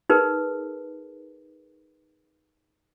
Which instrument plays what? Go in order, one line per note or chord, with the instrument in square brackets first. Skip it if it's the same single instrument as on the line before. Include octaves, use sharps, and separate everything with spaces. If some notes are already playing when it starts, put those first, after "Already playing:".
[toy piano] D#4 G#4 A#4 B4